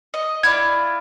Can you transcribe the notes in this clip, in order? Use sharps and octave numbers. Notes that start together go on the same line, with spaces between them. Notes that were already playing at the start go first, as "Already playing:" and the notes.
D#5
E4 F4 D5 G#6